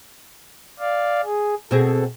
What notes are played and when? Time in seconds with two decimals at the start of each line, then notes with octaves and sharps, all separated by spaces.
0.79 D5 F5
1.24 G#4
1.71 B2 C4 G#4 A4